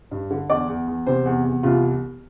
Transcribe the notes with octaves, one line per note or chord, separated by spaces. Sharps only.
G2
D3
E2 D5
E2
E2
C3 C5
E2
E2
C2 F4